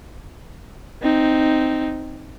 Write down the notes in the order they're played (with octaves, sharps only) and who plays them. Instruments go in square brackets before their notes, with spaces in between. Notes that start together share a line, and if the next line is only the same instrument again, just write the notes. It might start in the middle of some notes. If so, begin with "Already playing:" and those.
[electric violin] C4 D#4